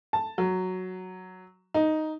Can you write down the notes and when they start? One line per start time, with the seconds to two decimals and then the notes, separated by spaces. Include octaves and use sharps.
0.13 A5
0.38 F#3
1.74 D#4